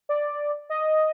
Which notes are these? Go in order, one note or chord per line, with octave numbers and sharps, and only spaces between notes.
D5
D#5